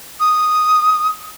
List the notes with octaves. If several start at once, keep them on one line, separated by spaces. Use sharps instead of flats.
D#6